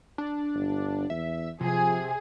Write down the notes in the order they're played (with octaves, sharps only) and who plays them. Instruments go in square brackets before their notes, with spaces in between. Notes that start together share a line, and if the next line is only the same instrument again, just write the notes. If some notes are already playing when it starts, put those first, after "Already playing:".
[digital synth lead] D4
[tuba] G1
[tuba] E2 [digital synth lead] E5
[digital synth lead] C3 [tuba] F3 [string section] G#4